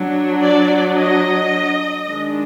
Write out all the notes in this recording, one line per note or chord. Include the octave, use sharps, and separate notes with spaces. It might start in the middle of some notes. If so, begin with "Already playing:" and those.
Already playing: F#3 D4
D5
D#5
D#3 G#3 D4